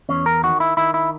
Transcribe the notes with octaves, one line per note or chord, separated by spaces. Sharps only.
E2 C#4
A#4
D#3 F#4
E4
D#3 E4
E4